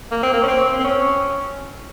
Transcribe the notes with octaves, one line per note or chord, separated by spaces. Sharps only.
A#3
C4
A#3
C#4
C4
C4
C#4